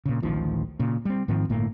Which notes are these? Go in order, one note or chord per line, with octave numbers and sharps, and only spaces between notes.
A#2 C#3
D1 A1 D#3 F3
A#2 C#3
G3 C4
G#2 D#3 F3 C4
G1 A2 A3 A#3